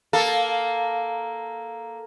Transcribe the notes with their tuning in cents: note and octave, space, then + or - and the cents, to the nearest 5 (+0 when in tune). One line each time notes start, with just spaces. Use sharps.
A#3 +0 A4 +0